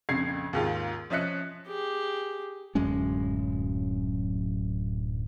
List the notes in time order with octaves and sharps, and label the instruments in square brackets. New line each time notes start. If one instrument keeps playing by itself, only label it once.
[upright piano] A#1 F2 C#3 G#6 C7
D#2 G#2 F4
F3 C#4 D#5 E5 F#6 C#7
[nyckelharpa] G4 G#4
[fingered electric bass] D1 F#2 G#3 C#4